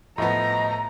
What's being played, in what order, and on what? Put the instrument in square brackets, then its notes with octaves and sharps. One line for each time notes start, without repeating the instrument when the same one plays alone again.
[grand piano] A2 F3 B3 [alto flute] D#5 [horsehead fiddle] A#5